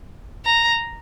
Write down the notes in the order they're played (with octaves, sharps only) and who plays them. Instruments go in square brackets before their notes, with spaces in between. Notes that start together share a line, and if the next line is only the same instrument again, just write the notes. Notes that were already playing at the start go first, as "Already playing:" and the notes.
[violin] A#5